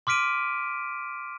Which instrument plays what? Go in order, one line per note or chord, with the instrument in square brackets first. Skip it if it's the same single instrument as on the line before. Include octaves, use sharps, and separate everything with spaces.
[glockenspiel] C6 D6 F6 B6 D7 D#7